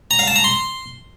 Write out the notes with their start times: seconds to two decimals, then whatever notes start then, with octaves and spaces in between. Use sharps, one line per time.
0.11 A#5
0.19 F5
0.27 A5
0.36 A#5
0.44 C6